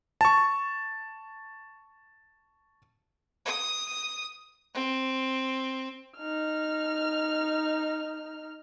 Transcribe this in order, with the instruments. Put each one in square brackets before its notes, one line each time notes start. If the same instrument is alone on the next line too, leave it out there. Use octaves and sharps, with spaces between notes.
[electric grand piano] A5 C#6
[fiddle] D#6
C4
[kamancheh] D#4 F6